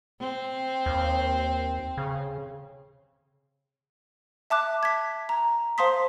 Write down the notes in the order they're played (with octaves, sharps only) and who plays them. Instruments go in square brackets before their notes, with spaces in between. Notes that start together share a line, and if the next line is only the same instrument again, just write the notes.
[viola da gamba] C4
[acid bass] D#2
C#3
[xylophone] E5 A5 D6 F#6
G#6 B6
A#5
C5 F5 A5 C6 D#6 B6